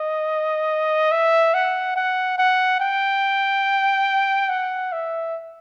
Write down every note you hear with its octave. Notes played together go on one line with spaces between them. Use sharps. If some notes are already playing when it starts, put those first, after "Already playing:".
Already playing: D#5
E5
F#5
F#5
F#5
G5
F#5
E5